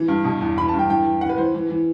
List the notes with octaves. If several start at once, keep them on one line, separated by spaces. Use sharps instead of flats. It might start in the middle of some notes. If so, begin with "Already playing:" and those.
Already playing: E3
G2
B2
E2
E3 B5
A5
G2
G5
E3 G5
E3
E3 F#5
B4
E3 C5
E3
E3